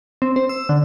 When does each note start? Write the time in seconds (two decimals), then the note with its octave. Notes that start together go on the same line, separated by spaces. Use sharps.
0.22 C4
0.36 C5
0.49 E6
0.69 D3